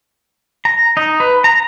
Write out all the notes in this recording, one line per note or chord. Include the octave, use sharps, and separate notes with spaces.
A#5
D#4
B4
A#5